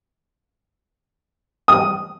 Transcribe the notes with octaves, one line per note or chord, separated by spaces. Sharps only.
D#6